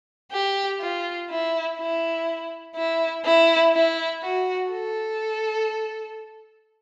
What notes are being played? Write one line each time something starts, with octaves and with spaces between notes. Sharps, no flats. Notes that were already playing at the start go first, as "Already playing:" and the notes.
G4
F4
E4
E4
E4
E4
E4
F#4
A4